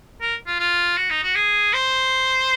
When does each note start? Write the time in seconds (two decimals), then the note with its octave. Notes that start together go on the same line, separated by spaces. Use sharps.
0.21 A#4
0.47 F4
0.60 F4
0.97 F#4
1.11 D#4
1.23 F#4
1.35 G#4
1.74 C5